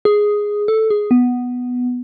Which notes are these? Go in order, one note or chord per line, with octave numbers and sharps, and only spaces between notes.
G#4
A4
G#4
B3